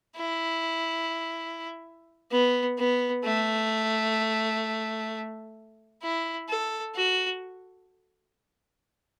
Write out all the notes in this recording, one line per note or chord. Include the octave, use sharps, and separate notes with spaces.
E4
B3
B3
A3
E4
A4
F#4